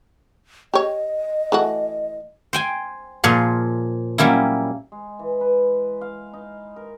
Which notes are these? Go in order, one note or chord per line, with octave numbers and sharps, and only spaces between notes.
G4 C#5 D#5
E3 A3 F#4
C5 G5 G#5
A#2 F3 G#4 C#5 C6
F#3 G3 A#3 C#4 E4
G#3
E3
B4
F5
D#4
A#4